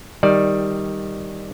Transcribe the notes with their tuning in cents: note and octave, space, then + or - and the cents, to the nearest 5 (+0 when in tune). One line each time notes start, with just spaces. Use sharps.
D#3 +0 G3 +5 D5 +10